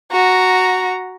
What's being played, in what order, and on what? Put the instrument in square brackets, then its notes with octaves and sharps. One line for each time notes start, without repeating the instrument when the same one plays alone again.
[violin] F#4 A#5